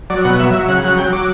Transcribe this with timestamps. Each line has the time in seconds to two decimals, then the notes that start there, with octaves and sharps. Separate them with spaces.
0.10 F#3 D5
0.25 B2 F#5
0.39 F#3 E5
0.54 F#3 E5
0.68 C#3 F#5
0.84 F#3 F#5
0.98 F#3 G5
1.13 F#3 D6